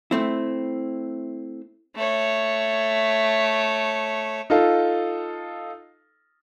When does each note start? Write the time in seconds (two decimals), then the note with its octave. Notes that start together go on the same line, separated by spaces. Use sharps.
0.11 A3 C4 E4
1.95 A3 C#5
4.50 D#4 F4 A4